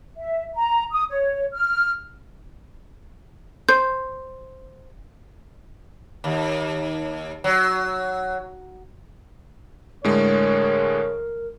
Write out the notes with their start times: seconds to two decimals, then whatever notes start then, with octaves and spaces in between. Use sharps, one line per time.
0.17 E5
0.56 A#5
0.91 D#6
1.09 C#5
1.53 F6
3.69 C5 G6
6.24 D#2
7.44 F#3
10.04 A2 D3 G#3 A#4 C#5